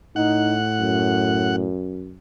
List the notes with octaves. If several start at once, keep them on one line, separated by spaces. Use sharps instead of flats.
A2 D#4 F#5
F#2